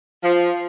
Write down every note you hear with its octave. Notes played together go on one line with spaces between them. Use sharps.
F3